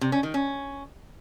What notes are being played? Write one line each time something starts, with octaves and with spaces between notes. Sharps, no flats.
C3
C#4
D#3
C#4